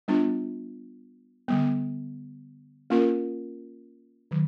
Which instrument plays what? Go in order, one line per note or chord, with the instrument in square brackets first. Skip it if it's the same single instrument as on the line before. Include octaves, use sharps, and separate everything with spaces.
[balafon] G3 B3 D4 F4
D3 G3 B3
A#3 C#4 F4 A#4
D#3 F#3